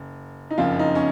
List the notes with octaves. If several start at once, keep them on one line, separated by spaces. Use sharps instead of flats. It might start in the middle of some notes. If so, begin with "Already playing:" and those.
Already playing: F#1
D#4
F#1 F2 C#3 F4
D#4
C#4